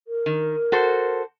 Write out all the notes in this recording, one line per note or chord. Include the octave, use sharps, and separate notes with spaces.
A#4
D#3
F#4 A4 C5